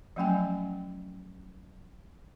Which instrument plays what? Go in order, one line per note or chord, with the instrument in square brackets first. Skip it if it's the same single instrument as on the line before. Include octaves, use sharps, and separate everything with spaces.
[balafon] F3 F#3 A3 C#4 G5 G#5